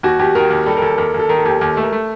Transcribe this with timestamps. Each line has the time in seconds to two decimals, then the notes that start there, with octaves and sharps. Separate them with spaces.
0.03 D#2 F#4
0.19 D#2 G4
0.35 D#3 A#4
0.50 D#2
0.66 G3 A4
0.77 A#4
0.82 D#2 A4
0.98 D#2 A#4
1.14 D#2 A4
1.29 D#3 A#4
1.38 A4
1.45 D#2 G4
1.61 D#2
1.77 A3
1.83 A#4
1.92 A3 A4